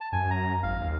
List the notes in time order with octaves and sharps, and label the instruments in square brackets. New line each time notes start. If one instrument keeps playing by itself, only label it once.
[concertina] A5
[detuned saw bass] F#2 [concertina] G#5
[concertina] A#5
[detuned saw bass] G#1 [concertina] F5
[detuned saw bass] D#2